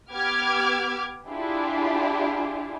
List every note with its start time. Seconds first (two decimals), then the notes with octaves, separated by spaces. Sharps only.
0.14 B3 G4 D6 F6 G#6
1.29 D4 E4 F4 G4 G#4